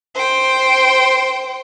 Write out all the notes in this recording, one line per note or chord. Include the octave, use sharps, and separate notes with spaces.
C5 G5